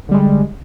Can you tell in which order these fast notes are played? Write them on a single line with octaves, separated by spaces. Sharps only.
D3 G3 G#3